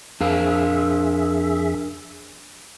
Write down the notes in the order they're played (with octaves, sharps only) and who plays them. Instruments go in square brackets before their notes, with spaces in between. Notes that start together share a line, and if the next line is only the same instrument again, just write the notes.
[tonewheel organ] F2 G#4 E5 [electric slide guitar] D4 A#4 F5